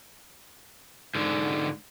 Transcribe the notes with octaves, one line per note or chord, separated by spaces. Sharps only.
G#2 D3